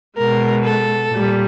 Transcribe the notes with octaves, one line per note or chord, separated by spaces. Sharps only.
B2 G#3 A#4
A4
A#2 G3